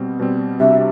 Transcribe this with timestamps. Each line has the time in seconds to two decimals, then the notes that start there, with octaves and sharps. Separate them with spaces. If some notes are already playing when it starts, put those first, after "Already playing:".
Already playing: B2 G3 C4
0.19 B2 G3 C4
0.60 C3 G3 D4 F#4 E5